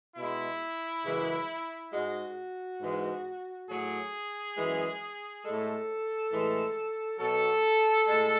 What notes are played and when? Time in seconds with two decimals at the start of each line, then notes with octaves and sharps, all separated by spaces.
0.16 B2 G#3 E4
1.04 F#2 C#3 E3 G#3
1.92 G#2 G#3 F#4
2.80 G#2 E3 G#3
3.67 A2 F#3 G#4
4.55 F#2 E3 G#3
5.43 A2 G#3 A4
6.31 A2 E3 G#3
7.19 B2 F#3 A4
8.07 A2 G#3